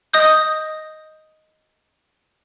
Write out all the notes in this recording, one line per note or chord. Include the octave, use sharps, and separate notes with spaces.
D#5 D#6 G6